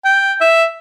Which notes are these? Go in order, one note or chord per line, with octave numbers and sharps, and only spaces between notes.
G5
E5